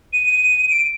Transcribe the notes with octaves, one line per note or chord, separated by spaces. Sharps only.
D#7
D#7
D7